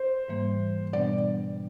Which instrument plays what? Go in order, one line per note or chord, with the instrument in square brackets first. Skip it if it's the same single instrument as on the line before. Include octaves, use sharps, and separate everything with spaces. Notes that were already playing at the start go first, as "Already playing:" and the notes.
Already playing: [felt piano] C5
[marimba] G#2 E3 G3 A#3
[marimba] B2 G3 B3 D4 [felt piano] D5